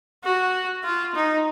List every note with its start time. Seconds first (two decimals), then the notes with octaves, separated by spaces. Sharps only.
0.24 F#4
0.84 F4
1.15 D#4